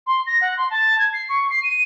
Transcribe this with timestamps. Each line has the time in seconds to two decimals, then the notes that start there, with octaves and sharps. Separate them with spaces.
0.07 C6
0.27 A#6
0.41 F#5
0.57 C6
0.70 A5
0.99 G#6
1.13 C7
1.29 C#6
1.50 C7
1.63 D#7